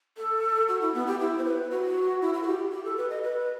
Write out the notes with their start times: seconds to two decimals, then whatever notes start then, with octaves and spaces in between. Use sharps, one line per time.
0.18 A4
0.68 F#4
0.81 E4
0.94 B3
1.07 G4
1.20 E4
1.38 C5
1.45 B4
1.71 F#4
2.22 E4
2.34 F#4
2.43 A4
2.47 G4
2.72 G4
2.85 A4
2.97 B4
3.10 D#5
3.23 B4